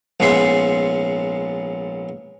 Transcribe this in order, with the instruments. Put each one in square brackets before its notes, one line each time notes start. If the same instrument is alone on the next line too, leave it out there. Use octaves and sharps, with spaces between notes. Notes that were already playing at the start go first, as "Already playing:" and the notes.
[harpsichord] A#1 G#2 B3 C#4 E5 C6